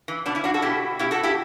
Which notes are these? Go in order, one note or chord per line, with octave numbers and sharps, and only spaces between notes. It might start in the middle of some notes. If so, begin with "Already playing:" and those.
E3
B2 B3 D4
C#4 E4
D4 F#4
F#4 A4
B2 E4 G4
B2 E4 G4
F#4 A4
E4 G4